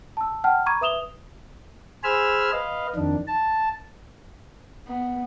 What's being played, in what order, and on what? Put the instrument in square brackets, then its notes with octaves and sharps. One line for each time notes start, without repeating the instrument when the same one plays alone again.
[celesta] A5 E6
F#5 G5 A5 F6
A#5 B5 C#6 D6 G#6 D#7
B4 E5 D#6 E7 F7 G7
[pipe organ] G#4 C5 G#5 B5 E6 F6
B4 D#5 F5
F2 D#3 D4
A5
[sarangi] B3